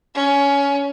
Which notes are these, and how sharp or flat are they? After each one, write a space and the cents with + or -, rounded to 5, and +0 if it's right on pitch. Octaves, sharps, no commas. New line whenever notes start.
C#4 +20